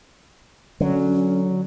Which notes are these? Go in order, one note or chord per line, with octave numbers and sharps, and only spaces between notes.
D3 F#3 C#4